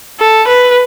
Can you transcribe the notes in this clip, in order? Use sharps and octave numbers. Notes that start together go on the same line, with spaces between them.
A4
B4